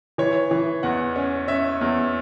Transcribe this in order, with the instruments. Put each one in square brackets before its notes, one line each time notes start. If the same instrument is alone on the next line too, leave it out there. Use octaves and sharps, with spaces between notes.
[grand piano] E3 C#5
E3
E2 F#5
C#4
C#4 E5
E2